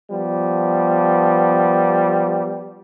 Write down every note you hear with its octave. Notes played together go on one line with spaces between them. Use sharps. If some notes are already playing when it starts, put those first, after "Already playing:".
F3 G3 B3